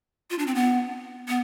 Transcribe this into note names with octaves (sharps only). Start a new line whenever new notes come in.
F4
D4
C4
B3
B3